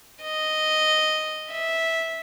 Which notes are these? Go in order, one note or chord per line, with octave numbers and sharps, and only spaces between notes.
D#5
E5